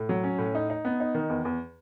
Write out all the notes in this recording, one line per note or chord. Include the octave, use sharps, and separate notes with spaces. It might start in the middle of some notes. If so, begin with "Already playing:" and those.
Already playing: A2
F#3
C#4
A2
D#4
D#4
B3
D#4
D#3
E2
E2